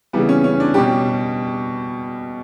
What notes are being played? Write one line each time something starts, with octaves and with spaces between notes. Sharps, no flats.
C#3 E3 G3 B3
C#4
C#4
D4
B2 G3 G4